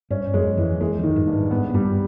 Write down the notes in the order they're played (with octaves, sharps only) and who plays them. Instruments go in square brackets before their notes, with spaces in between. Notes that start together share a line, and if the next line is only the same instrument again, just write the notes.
[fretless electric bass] G2 [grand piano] C#4
[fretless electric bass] F#2 [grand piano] G#3
[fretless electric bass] F2 [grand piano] E3
[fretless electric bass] E2 [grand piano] G#3
[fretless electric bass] F2
[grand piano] D#3
[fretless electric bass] G2
[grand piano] G2
[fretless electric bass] G#2
[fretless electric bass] G#2 [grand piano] B3
[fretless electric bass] G#2
[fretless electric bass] G2 [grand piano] G3